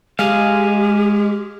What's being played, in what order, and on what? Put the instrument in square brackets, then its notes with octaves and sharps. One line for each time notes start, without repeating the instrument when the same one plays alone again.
[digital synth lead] G#3 [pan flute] G4 [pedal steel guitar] G#4 F5